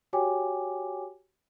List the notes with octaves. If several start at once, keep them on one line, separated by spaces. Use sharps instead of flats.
F#4 G4 C#5 G5 G#5 D6